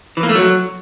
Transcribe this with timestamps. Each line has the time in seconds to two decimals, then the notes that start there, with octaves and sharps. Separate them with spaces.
0.17 E3
0.23 A#3
0.29 A3
0.35 F#3